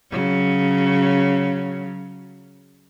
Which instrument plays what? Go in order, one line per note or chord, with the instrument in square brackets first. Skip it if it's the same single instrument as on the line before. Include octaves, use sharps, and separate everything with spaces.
[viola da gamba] C#3 F#3